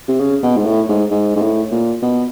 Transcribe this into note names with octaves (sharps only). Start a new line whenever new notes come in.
C3
C#3
B2
G#2
A2
G#2
G#2
G#2
A2
A#2
B2